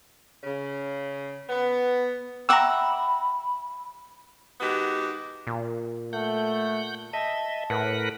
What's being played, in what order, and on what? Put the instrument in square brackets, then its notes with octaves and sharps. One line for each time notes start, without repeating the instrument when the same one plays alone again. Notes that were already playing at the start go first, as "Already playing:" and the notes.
[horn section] C#3
B3
[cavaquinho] E5 F#5 D6 [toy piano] G5 C#6 [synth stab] A#5 E6 [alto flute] B5
[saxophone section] D#3 G#3 B3 F#4 G4
[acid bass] A#2
[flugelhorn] A3 [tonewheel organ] F#5 G6
[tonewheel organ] D#5 E5 [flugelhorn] A5
[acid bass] A2 [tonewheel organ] A#4 B4 F#5